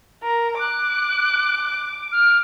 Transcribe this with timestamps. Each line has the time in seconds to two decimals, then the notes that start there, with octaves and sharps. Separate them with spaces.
0.23 A#4
0.59 D6 F#6
2.12 F6